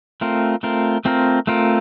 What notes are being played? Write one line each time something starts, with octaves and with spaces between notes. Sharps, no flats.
A3 C4 F4 A#4
A3 C4 F4 A#4
A3 C4 F4 A#4
A3 C4 F4 A#4